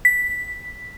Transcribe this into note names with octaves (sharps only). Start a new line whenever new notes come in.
B6